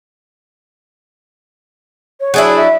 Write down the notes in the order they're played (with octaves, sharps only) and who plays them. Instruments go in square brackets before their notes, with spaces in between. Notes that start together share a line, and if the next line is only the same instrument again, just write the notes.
[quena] C#5
[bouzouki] F#3 D4 E4 [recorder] G#4
[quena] E5